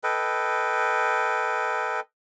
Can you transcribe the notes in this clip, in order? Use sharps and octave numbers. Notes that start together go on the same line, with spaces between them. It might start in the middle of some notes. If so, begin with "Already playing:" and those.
A4 B4 D#5 G5